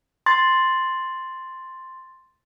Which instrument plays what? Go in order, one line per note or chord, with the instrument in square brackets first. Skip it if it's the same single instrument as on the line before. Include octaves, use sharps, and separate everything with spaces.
[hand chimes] C6 A6